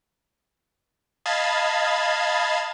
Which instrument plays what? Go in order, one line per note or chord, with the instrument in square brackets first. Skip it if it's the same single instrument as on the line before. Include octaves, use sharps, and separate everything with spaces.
[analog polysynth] D#5 F5 A5 B5 G#6 A6